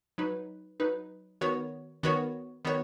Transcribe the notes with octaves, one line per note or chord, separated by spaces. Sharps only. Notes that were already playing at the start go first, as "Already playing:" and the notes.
F#3 D#4 B4
F#3 D#4 B4
D#3 B3 F#4 C#5
D#3 B3 F#4 C#5
D#3 B3 F#4 C#5